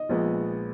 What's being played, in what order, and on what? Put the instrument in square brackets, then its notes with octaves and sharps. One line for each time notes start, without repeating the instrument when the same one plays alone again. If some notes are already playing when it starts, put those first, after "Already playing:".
Already playing: [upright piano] D#5
A#1 A#2 G#3 B3